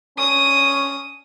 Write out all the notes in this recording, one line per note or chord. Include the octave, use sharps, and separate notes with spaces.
C#4 D#6